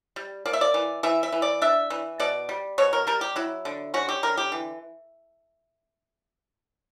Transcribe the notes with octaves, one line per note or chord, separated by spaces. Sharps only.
G3
A#3 D5
E5
D5
E3
E3 E5
E5
E3
D5
D4 E5
E3
B2 D5
G3
B2 C#5
A#4
G3 A#4
G4
F#3 E4
D3
C#4 F#4
G4
D3 A#4
G4
E3